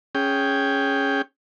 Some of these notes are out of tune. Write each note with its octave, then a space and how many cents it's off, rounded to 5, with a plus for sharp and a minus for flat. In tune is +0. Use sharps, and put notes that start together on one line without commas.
C#4 +0 G#4 +0 G5 +0